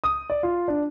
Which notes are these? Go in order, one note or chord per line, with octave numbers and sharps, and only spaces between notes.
D#6
D5
F4
D4